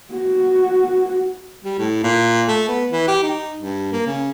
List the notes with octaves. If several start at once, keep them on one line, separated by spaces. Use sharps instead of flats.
F#4
G3
A2
A#2
A3
B3
E3
G4
D#4
G2
A#3
C#3